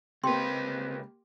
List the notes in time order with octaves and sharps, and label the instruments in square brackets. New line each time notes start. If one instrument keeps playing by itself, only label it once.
[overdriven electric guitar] C#2 B4 [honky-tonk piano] A#3 G4 [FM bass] C4 [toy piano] G5 C6